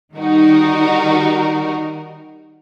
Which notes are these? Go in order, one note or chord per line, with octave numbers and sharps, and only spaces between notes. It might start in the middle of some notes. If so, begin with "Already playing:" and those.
D#3 G3 D#4 F#4 A#4